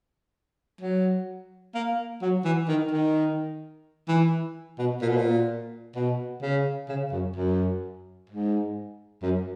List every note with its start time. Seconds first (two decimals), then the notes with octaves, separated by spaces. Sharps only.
0.81 F#3
1.75 A#3
2.22 F#3
2.45 E3
2.68 D#3
2.91 D#3
4.08 E3
4.79 B2
5.02 A#2
5.09 B2
5.17 A#2
5.96 B2
6.42 C#3
6.89 C#3
7.12 F#2
7.36 F#2
8.30 G#2
9.23 F#2